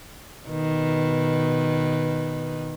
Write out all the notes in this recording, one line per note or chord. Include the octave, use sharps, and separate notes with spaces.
B2 D#3 B4